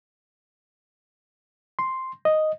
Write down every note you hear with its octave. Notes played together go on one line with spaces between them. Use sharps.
C6
D#5